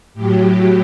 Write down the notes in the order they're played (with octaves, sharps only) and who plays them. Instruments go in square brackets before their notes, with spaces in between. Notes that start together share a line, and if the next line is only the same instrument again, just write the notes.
[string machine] A2 F#3 G4